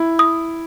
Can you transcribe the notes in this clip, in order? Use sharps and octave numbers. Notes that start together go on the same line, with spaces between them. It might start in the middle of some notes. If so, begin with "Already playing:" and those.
Already playing: E4
D#6